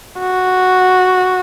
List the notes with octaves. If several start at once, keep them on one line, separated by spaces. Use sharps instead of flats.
F#4